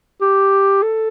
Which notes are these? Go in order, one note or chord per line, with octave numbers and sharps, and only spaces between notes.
G4
A4